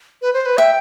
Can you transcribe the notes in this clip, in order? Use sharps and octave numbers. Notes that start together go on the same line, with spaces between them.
B4
C5
B4
E5 G5